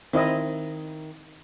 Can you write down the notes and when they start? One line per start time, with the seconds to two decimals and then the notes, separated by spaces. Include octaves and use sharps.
0.14 D#3 C4 E4 D#5